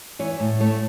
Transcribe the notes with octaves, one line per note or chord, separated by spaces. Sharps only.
E3 C#5
A2
A3 C#5